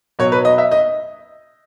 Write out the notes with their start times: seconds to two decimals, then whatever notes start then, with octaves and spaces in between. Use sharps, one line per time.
0.19 B2 F#3 C#5
0.32 B4
0.45 D#5
0.58 E5
0.71 D#5